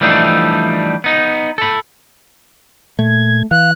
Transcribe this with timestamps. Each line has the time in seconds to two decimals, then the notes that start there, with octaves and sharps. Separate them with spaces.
0.01 E3 F3 G3 A3 D4 D#4
1.04 B3 D#4
1.58 A4 B5
2.99 A#2 A3 G#6
3.51 E3 F5 F#6